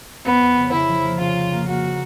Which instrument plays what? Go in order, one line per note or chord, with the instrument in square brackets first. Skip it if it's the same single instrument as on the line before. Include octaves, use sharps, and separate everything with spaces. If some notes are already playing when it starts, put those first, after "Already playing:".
[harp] F2 [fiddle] B3
[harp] F2
C#3
[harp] C#3 [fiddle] E4
[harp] F3
A#3
[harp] C#3 [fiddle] F4
[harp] A#3
A#3
[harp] A#3 [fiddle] F#4